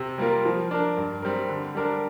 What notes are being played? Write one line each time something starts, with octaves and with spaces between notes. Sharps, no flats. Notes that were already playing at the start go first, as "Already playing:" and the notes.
Already playing: C3
G3 A#3 F4 A#4
F3
D4 A#4
G2
G3 C4 A#4
D3
G3 D4 A#4